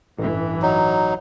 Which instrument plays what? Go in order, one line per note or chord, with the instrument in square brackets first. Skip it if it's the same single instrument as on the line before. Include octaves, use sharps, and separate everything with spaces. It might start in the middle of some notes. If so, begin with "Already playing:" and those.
[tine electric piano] A1 [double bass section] G2 E3
[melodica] F#3 D#4